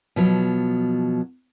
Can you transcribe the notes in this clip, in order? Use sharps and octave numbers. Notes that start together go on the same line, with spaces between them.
B2 F3 F#3